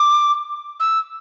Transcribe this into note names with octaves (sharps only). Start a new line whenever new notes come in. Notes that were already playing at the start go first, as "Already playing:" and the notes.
Already playing: D6
E6